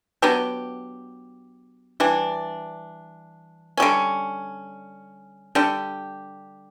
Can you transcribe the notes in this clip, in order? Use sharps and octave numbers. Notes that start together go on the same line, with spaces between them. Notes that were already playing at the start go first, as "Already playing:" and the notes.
F#3 B3 D4 G4
E3 G3 D4
D3 G3 C#4
D3 G3 D4 G4